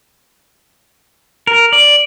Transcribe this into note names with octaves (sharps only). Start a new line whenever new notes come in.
A#4
D5